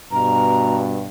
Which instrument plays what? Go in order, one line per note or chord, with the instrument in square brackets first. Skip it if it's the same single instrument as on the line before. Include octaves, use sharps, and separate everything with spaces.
[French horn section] G2 B2 [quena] A#5